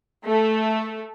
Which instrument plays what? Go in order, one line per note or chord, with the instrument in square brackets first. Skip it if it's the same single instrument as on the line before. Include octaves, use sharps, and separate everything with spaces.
[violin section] A3